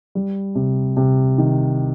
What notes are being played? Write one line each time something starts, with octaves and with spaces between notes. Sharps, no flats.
G3
C3
C3
D#3